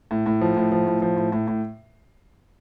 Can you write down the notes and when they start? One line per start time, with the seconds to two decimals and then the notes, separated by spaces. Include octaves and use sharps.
0.11 A2
0.26 A2
0.41 F3
0.56 A2
0.72 F3
0.87 A2
1.02 F3
1.17 A2
1.32 A2
1.47 A2